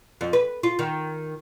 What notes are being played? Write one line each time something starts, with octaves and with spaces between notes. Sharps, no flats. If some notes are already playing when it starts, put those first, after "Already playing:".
F2
B4
F4
D#3